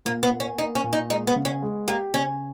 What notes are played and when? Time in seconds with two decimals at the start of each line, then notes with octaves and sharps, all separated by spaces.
0.05 A#2 A#3
0.23 B3
0.31 A#3
0.40 C#4
0.58 A#3 D#4
0.75 C#4
0.84 A#2
0.93 D#4
1.10 G#3 D#4
1.27 B3
1.36 C#3
1.45 C#4
1.62 G#3
1.88 A#3 G4
2.14 C#3 C#4